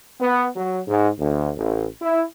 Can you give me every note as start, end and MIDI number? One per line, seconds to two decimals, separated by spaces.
0.21 0.45 59
0.56 0.81 54
0.88 1.10 44
1.18 1.50 38
1.56 1.86 33
2.01 2.23 64